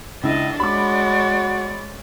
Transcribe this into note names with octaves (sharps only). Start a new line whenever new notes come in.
C#2 D4 E4 D#5
G#3 F#4 C#5 D5 B5 D6